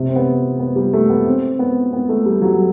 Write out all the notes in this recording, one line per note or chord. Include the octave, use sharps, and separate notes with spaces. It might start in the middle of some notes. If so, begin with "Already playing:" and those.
Already playing: C3
C4
B3
B3
G3
A3
B3
C4
B3
B3
A3
G3
F#3